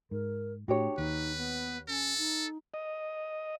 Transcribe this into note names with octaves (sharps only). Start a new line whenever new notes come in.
G#2 A#4
A2 D4 F#4 G4 C#5
D#2 D#4 B4
B3
C#4 A4
D#4
D#5